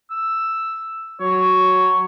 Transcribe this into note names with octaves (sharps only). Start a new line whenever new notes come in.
E6
F#3 C#5